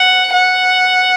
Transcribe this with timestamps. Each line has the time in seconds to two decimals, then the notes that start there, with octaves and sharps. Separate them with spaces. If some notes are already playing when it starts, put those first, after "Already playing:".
Already playing: F#5
0.33 F#5